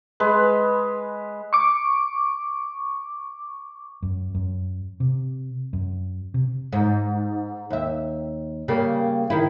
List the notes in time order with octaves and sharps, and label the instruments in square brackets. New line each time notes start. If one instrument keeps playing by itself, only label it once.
[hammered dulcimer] G#3 B4
[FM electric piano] C#6 D6
[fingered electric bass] F#2
F#2
C3
F#2
C3
[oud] G#2
D#2 E5
C#3 G3 A#3
D#3 E4